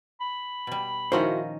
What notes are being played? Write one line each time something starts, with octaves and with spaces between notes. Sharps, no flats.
B5
B2 G3
A#2 D#3 F3 C#4 E4 F#4 A#4 C5